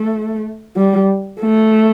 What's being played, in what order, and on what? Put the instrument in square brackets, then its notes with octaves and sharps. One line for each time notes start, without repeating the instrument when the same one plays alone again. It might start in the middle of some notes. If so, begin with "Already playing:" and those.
Already playing: [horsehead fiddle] A3
G3
A3